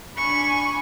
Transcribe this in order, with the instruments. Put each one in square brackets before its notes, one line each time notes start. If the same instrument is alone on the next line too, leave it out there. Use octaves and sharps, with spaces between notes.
[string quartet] D4 G#5 B5 [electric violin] C#6